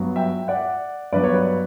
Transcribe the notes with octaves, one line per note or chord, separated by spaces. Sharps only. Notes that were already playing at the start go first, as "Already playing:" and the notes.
Already playing: G2 F#3 B3
E5 G5
D5 F#5
G2 F#3 B3 B4 D5
C#5
B4